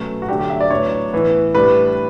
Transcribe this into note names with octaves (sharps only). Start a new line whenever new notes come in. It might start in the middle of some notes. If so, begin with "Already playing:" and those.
Already playing: B2 F#3 A3 C#4
F#4
D3 F#3 A3 D4 G4
G4
E5
D5
A2 F#3 B3 D4 C#5
A2 E3 B3
A2 G3 D4 B4